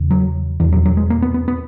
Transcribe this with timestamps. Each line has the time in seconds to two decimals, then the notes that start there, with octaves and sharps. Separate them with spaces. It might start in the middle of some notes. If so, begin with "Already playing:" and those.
Already playing: E2 C#3
0.11 F#3
0.60 E2 B2 E3
0.72 F#3
0.86 F#3
0.97 G#3
1.10 A#3
1.22 B3
1.34 B3
1.48 B3